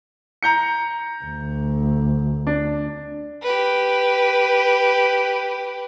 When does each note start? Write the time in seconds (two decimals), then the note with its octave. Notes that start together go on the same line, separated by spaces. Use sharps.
0.43 A#5 G6 C#7
1.24 D2
2.47 D4
3.43 G4 B4